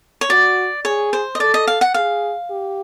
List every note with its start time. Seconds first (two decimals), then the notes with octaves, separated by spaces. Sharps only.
0.21 C#5
0.30 F#4 D5
0.85 G#4 C#5
1.13 C5
1.35 D#5
1.40 A4 D5
1.54 D#5
1.67 F5
1.81 F#5
1.94 G#4 F5
2.50 G4